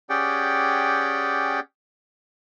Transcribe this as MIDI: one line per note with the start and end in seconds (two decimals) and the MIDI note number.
0.10 1.60 61
0.10 1.60 67
0.10 1.60 68
0.10 1.60 74
0.10 1.60 78
0.10 1.60 79